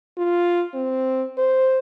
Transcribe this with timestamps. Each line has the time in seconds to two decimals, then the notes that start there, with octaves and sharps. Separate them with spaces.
0.18 F4
0.74 C4
1.38 C5